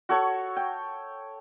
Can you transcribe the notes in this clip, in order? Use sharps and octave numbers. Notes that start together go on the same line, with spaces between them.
F#4 A4 C#5 C#6
G5